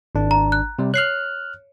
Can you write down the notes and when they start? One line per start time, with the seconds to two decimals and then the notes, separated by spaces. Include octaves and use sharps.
0.15 G#1 D4
0.31 A#5
0.52 F#6
0.79 C3 G3
0.94 C#5 F6 F#6 C7 F#7